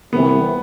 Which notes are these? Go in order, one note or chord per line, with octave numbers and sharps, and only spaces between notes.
C2 C3 E3 B3